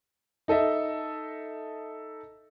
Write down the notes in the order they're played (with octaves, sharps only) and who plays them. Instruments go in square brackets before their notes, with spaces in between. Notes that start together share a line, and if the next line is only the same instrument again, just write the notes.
[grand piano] D#4 A4 D#5 E5